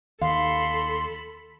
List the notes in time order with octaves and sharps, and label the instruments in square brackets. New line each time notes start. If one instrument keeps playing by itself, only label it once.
[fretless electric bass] D#2 D#3 [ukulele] D#4 F5 [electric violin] A4 B5 [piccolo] C6